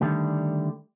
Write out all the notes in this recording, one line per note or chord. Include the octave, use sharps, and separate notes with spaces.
D3 D#3 G3 A3